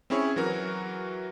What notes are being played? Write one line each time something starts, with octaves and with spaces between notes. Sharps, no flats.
C4 C#4 E4 G#4 C#5
E3 F#3 F#4 A#4